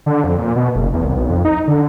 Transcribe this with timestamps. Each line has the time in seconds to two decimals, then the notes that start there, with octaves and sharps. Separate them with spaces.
0.06 D3
0.24 F2
0.38 A#2
0.56 B2
0.75 F#1
0.93 E2
1.05 C2
1.16 B1
1.30 F2
1.45 D#4
1.68 D3